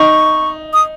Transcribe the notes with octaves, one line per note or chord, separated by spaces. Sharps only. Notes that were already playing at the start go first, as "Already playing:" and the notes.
Already playing: D#4 C#6
D#6